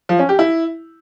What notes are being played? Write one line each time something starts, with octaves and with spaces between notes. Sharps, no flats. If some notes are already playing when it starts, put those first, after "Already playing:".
F3
C#4
G4
E4